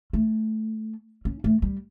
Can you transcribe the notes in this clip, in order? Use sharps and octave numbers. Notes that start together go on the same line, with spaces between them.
A3
C#4
A3
G3